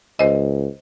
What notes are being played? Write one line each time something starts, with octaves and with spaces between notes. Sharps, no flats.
C#2 C5 D#5